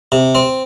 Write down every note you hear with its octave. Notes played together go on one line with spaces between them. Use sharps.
C3
C4